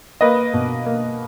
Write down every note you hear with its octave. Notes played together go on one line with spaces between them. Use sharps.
A#3 B4 D#5
B2
A#3